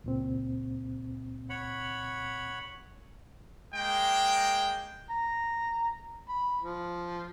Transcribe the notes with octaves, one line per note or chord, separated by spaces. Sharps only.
C#2 A#2 C4
C#5 F#5 B5
G#3 A#3 G5
A#5
B5
F3